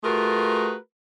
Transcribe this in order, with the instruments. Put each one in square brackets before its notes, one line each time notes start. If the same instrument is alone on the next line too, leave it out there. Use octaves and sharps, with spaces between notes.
[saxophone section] A3 F4 F#4 G#4 A#4 B4